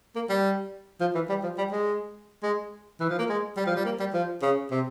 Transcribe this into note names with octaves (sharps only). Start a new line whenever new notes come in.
A#3
G3
F3
E3
G3
F3
G3
G#3
G#3
E3
F3
A#3
G#3
G3
F3
G3
A#3
G3
F3
C#3
C3